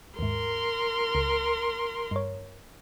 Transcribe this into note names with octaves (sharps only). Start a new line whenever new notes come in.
D#2 G#2 A#4 C6
C#2
G2 C#5